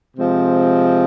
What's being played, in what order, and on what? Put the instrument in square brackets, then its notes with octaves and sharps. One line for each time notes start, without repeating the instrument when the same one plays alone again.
[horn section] C3 F3 G#3 C4